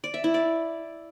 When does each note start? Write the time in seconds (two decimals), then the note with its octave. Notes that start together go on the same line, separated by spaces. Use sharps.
0.04 D5
0.14 E5
0.24 E4
0.34 D5